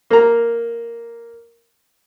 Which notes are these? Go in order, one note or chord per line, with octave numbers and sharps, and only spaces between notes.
A#3 A#5